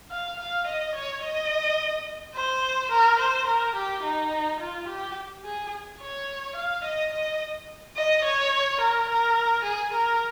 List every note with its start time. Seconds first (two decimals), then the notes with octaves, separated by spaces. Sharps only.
0.11 F5
0.39 F5
0.67 D#5
0.95 C#5
1.23 D#5
2.35 C5
2.91 A#4
3.19 C5
3.47 A#4
3.75 G4
4.03 D#4
4.60 F4
4.88 G4
5.44 G#4
6.00 C#5
6.56 F5
6.84 D#5
7.12 D#5
7.96 D#5
8.24 C#5
8.81 A#4
9.09 A#4
9.64 G#4
9.93 A#4